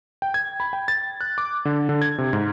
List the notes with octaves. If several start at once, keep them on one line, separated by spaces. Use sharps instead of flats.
G5
G#6
B5
G5
A6
F#6
D6
D3
D3
G#6
C3
G#2